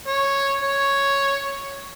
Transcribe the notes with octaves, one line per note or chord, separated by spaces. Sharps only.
C#5
C#5